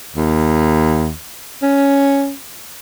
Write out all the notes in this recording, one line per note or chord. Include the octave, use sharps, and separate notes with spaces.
D#2
C#4